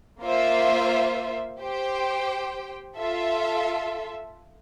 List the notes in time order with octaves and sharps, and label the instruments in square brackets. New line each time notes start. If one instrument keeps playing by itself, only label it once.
[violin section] A#3 F4 C5 E5
G4 C5 G5
F4 A4 E5